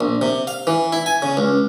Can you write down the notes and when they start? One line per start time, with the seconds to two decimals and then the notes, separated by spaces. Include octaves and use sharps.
0.01 A#1
0.22 C3
0.47 F5
0.67 E3
0.92 E4
1.06 G#5
1.22 C#3
1.37 C#2